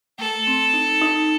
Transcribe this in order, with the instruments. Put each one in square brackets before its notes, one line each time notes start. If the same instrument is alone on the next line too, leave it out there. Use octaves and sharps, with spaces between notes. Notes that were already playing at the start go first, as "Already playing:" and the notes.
[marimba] A3 [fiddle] A4
[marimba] C4
D#4
D#4